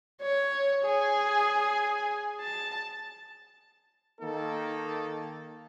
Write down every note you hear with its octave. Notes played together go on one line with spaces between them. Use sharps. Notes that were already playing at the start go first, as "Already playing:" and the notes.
C#5
G#4
A5
D#3 A#3 D#4 A4